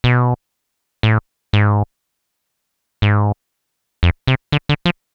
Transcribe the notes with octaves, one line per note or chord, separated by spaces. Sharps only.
B2
A2
G#2
G#2
F2
C3
D3
D3
F3